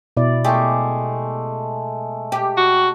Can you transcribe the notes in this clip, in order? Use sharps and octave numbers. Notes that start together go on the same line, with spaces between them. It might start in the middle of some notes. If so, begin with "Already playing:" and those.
B2 E4 D5
G#3 A3 G4
G4
F#4